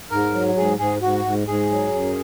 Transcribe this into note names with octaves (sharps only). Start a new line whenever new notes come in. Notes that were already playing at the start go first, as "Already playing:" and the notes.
G#2 A#4
F#3
G#2 G#4
G#2 G#4
G#2 F#4
G#2
G#2 G#4
F#3
F#2